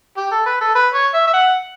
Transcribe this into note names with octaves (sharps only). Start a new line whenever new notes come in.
G4
A4
B4
A4
B4
C#5
E5
E5
F#5